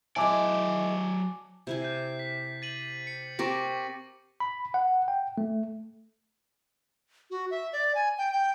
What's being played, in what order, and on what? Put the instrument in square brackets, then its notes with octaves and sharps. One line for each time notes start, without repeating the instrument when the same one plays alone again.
[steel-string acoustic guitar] E3 G#3 [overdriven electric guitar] F#3 D5 [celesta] G#5 A5 D6
[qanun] C3 E4 G#5
[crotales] G6 C7
B6
A6 D#7 F#7
C#7
[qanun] C4 G4 A#4 [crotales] C#6 D6 A#6
[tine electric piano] B5
F#5
G5
A3
[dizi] F#4
E5
D5
G#5
G5
G5